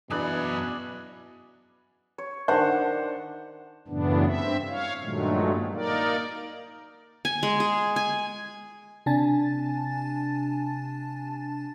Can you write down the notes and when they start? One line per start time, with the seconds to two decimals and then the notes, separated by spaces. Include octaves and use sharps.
0.10 F#2 B2 E3 D4 G#4 B5
2.18 C#5
2.48 D#3 D4 C5 F#5
3.88 F#2 A2 C#3 E3 B3 D4
4.26 G2 C4 E5
4.68 C#5 F5
5.02 G2 A#2 D#3 F#3 G#3 A3
5.74 A#3 D#4 A#4 D5
7.25 G#5
7.43 G#3
7.60 G#4
7.96 G#5
9.06 C3 D4 G#5 A5 A6